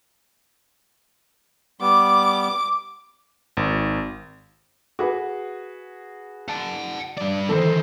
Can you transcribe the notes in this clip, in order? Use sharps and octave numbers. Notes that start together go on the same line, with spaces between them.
G3 B3 D6
G#1
F#4 G#4 B4
F#5 A5
G2 D5
D#3 E3 A4 C5